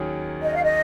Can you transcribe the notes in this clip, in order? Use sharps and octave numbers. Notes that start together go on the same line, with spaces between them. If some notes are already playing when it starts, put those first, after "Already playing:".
Already playing: D#2 D#3 F#3 C#4 G#4
D#5
F5
D#5